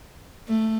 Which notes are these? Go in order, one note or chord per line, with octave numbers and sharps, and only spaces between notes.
A3